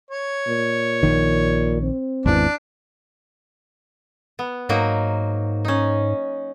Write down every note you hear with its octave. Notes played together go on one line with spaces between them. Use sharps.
C#5
A#2
A#1 D#3
C4
G#1 E2 E3 D4
B3
G#2 F#3 A#3 D#4
C#4 D#4